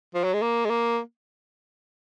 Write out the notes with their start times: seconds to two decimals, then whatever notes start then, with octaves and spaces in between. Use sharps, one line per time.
0.15 F3
0.24 F#3
0.33 G#3
0.42 A#3
0.65 G#3
0.70 A#3